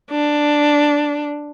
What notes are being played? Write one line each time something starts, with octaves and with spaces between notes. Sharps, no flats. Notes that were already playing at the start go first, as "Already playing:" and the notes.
D4